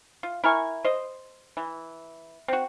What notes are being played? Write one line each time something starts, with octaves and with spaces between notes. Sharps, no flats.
F4
E4 A#4 G#5 C#6
C5 D#5
E3
C4 F#4